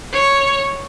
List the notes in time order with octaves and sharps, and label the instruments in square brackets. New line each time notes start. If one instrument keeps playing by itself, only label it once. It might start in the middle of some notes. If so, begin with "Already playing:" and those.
[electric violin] C#5